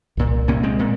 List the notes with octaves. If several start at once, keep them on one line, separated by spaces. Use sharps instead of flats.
C2 A#2
C2 A#2 A#3 C#4
G#3 C4
A#2